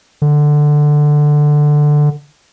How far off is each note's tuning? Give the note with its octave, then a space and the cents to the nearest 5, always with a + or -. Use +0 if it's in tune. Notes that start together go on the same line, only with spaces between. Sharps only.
D3 +10